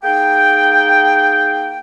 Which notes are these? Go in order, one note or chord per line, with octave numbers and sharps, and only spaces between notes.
A#3 D#4 G#4 G5